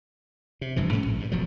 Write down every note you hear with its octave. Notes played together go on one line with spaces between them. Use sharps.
C3
F1 G2 E3 F3
G#2 C#4
A#1
G2
E1 F3 F#3